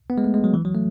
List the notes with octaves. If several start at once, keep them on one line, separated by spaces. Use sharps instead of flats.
B3
G#3
A3
G#3
F#3
E3
F#3
A3